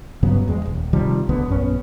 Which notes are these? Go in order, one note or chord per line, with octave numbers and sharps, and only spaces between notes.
G2 C#3 F#3 B3
E2 G#3
D#1
C3 D#3 F3 G3
D1 C#2 D3 B3
A#1 F#2 B3 C#4